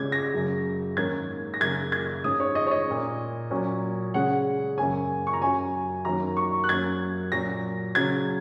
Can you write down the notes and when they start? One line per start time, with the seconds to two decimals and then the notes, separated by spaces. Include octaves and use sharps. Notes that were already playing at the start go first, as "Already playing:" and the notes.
Already playing: C#3 G#3 C#4 G#6
0.12 A#6
0.34 F#2 C#3 F#3
0.97 G#2 D#3 A#3 C#4 G#6
1.54 A#6
1.60 F#2 C#3 A#3 G#6
1.92 G#6
2.24 G#2 G#3 C#4 D#6
2.40 C#5
2.55 D#5
2.67 C#5
2.71 D#5
2.87 A#2 A#3 C#4
3.51 A#2 F#3 C#4
4.14 C#3 G#3 C#4 F#5
4.78 F#2 C#3 A#3 C#4 G#5
5.27 C#6
5.33 A#5
5.42 F#2 F#3 C#4 G#5
6.05 F#2 D#3 F#3 A#3 C#4 A#5
6.37 C#6
6.64 F#6
6.69 F#2 F#3 A#3 C#4 G#6
7.32 A#2 F#3 C#4 A#6
7.95 C#3 F#3 C#4 G#6